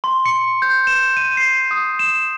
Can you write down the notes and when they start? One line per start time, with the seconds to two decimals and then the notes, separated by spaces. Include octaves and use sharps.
0.04 C6
0.26 C#7
0.62 G6
0.87 E7
1.17 D#7
1.37 C7
1.71 D#6
1.99 E7